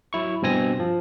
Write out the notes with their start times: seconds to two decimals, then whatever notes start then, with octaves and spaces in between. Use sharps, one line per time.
0.13 F#3 E4 C#6
0.42 G2 B2 C4 G#5 A#6
0.80 F3